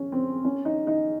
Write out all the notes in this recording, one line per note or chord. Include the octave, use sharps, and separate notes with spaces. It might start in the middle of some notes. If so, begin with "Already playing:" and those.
Already playing: C#4
C4
C#4
D#4
D#4